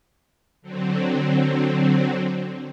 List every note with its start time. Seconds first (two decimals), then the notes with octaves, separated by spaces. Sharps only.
0.62 D3 F#3 C4